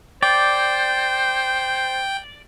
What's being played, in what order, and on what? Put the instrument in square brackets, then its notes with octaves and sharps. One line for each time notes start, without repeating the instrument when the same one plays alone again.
[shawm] C5 [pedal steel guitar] D5 [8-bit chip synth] G5